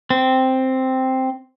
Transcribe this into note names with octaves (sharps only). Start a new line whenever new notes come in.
C4